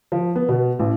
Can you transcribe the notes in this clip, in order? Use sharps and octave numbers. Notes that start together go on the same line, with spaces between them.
F3
B3
B2
A1